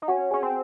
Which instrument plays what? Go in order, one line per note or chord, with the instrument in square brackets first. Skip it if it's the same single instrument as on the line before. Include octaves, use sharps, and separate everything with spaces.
[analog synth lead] D#4
[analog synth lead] C#4 [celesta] F#4 F#5
[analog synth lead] C#4 [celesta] G#4 G#5
[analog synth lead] C4